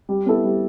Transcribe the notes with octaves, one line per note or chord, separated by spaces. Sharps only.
G3
B3 E4 A4
G3